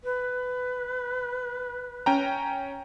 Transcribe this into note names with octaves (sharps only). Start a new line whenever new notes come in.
B4
C#4 G5 A#5